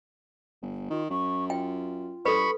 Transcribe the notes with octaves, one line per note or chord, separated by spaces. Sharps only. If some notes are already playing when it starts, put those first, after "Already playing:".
G1
D#3 F4
F#2 C#6
F4 G5
G2 A4 B4 B5 C#6